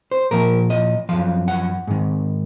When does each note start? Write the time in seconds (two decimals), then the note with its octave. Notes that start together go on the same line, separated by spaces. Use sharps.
0.11 C5
0.31 A#2 F3 A#4
0.70 D#5
1.09 F#2 F3 F5
1.48 F#5
1.87 G#2 D#3